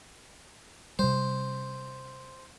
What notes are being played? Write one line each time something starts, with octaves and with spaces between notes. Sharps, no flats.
C3 G3 C5